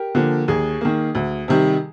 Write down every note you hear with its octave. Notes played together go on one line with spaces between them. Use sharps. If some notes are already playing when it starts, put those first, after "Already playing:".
Already playing: G4 A#4
D3 F3 A#3
D#2 G#4
D#3 A#3
D2
C3 D#3 G3